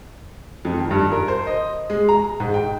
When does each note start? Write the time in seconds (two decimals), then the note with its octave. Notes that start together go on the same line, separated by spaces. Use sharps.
0.65 F2
0.79 D#3
0.91 G2
1.12 A#4
1.28 C5
1.46 D#5
1.90 G#3
2.09 A#5
2.40 G#2
2.54 G5